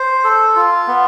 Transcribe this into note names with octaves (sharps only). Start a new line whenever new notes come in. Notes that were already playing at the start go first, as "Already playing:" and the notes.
Already playing: C5
A4
F4
B3